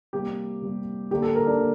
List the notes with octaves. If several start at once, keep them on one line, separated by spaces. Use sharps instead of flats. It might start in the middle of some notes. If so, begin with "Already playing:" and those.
C3 G3 A#3 G4
C3 G3 A#3
D3 G3 A#3 G4
A4
A#4
D4
A#3